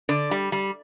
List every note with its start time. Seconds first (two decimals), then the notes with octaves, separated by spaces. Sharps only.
0.09 D3 D5
0.31 G3
0.52 G3